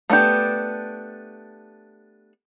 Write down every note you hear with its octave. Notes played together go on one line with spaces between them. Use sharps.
A3 B3 D4 G4